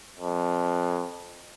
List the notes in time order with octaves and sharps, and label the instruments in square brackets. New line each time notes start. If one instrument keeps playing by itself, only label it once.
[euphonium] F2